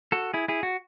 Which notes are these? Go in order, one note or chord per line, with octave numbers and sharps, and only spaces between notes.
F#4 A4
E4 G#4
E4 G#4
F#4